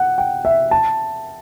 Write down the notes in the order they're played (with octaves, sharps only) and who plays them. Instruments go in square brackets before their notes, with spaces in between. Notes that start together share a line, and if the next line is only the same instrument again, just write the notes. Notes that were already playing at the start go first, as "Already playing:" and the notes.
Already playing: [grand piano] F#5
G5
E5
A5